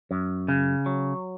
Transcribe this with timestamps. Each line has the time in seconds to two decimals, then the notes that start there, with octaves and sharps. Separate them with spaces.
0.11 F#2
0.48 C#3
0.86 F#3